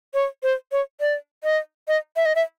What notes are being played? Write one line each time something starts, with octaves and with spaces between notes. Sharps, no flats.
C#5
C5
C#5
D5
D#5
D#5
E5
D#5
E5